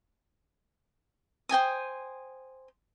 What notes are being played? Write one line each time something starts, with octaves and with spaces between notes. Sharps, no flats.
C5 G5 G#5 D#6